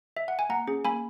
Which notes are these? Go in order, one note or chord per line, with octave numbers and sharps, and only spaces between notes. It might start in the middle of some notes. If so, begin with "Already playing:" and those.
E5
F#5
G#5
A#3 F#5 A#5
C#4 G#4
A#3 G#5 B5